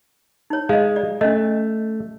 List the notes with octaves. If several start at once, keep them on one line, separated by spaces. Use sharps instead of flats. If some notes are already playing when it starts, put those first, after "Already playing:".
D#4 C#5
G#3 D#5 F5
D5
A3 C#4 D#5